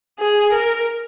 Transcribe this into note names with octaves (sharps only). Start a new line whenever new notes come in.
G#4
A#4